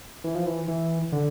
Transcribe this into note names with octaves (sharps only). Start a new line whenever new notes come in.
E3
F3
E3
E3
D3